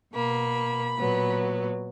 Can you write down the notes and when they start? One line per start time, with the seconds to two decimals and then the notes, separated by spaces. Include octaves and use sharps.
0.15 B2 A#3 B5
0.98 A#2 F#3 B3